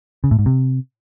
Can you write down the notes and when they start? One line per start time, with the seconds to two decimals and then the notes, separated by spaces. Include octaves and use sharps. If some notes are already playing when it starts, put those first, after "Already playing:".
0.24 C#3
0.31 A2
0.39 G#2
0.46 C3